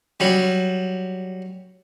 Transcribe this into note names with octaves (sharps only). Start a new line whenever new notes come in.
F#3 G3